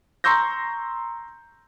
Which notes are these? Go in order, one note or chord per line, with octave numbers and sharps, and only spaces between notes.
A#5 C6 C#6 E6 G6 A#6